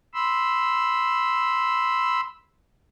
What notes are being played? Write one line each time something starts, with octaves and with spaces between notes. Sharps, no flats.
B5 C6 E6